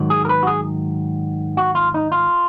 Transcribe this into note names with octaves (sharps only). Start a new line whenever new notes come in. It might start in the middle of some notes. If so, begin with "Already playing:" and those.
Already playing: G#2 D#3 F#3
G#4
A#4
B4
F#4
G#4
F#4
F4
D#4
F4